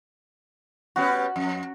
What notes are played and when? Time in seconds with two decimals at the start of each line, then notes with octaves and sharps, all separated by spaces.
0.96 G3 B3 C#4 F#4
1.36 F2